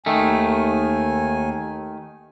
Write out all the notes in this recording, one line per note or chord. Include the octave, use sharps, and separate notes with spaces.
D#2 D#3 A3 G#5